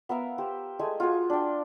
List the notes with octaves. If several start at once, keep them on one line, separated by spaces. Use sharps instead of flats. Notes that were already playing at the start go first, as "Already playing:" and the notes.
B3 A#4 E5 F5
G4 C5
G#3 A3 G#5
F4 F#4 G#4
D4 G5